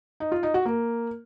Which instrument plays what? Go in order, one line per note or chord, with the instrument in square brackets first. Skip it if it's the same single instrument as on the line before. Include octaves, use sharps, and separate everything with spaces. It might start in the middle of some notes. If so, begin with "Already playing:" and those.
[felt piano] D#4
F4
D#4
F#4
A#3